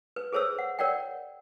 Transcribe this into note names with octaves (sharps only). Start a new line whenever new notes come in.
B4
G#4 A4 C5 C#5 E6
F#5
A#4 C#5 D5 F#5 G5